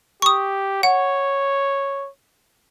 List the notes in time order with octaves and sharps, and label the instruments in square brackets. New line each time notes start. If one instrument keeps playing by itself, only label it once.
[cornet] G4 [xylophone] C#6 D#6
[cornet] C#5 [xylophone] F#5